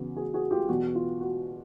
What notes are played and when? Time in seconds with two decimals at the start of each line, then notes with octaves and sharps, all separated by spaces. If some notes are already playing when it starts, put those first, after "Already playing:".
Already playing: E2 C#3 F#3
0.16 F#4 G#4
0.34 F#4 G#4
0.51 F4 G4
0.69 E2 B2 F#3 F#4
0.95 F4
1.21 F#4